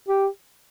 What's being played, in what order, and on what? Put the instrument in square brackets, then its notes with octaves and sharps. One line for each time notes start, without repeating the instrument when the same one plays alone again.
[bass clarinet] G4